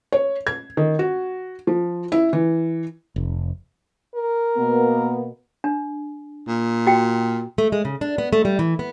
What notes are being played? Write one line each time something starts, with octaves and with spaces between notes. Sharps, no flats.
C#5
G#6
D#3
F#4
F3
E4
E3
F1
A#4
B2 A#3 B3
D4
A#2
F#4 G5
A3
G#3
C#3
D4
B3
A3
G3
E3
B3